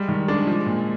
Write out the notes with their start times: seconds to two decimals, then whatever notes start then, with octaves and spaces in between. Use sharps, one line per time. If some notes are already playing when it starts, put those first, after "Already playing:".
Already playing: G3 G#3
0.08 D#3
0.28 G#3 D4
0.47 F3
0.66 A#2